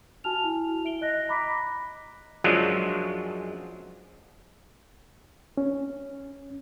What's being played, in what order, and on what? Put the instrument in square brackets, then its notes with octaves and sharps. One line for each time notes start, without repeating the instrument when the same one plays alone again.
[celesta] F#4 G#5 A5 F6 F7
E4
E4 E5 D7 G7
D#5 F#6 A#6
A#5 B5 D6 F#6 A#6 B6
[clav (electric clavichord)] F#2 F3 F#3 G#3 D4 F4
[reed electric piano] C#4